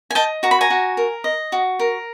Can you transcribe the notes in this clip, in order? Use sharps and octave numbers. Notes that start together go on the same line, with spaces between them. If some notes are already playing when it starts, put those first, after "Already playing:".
G#5
D#5 G5 A5
F#4 A#5
B5
G#5 A#5
F#4
A#4
D#5
F#4
A#4